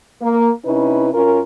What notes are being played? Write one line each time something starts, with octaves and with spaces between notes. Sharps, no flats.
A#3
C3 C#4 D#4 E4 B4
F#2 C#4 F4 A#4